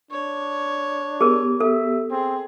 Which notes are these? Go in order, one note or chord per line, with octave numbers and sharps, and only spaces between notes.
D4 C#5
B3 G4 G#4 A#4
A4 E5
C4 G#4